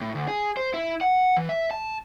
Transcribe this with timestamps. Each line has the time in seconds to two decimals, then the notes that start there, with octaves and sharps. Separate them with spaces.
0.01 A2
0.15 D2
0.28 G#4
0.57 C5
0.74 E4
1.01 F#5
1.37 E3
1.49 E5
1.71 A5